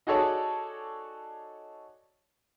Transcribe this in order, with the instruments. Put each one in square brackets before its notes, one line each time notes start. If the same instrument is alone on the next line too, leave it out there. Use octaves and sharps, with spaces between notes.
[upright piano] D#4 F#4 G#4 A4 C#5 D5